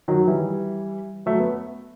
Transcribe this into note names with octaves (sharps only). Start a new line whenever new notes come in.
D#3 F#3
E3 G3
F#3 A3
B3